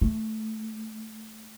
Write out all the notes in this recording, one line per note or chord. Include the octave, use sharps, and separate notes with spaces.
A3